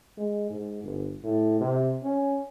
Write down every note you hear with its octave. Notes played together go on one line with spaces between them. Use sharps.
G#3
G#2
G1
A2
C3
C#4